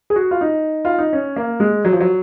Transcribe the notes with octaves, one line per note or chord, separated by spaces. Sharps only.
G#4
F#4
F4
D#4
F4
D#4
C#4
A#3
G#3
F#3
F3
F#3